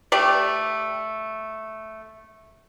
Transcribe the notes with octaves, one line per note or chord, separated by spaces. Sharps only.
A3 G4 D5